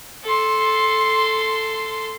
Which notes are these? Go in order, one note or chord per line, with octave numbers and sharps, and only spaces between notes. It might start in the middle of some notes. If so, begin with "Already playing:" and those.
A4 C6